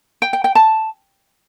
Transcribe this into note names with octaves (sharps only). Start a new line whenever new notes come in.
G5
G5
G5
A5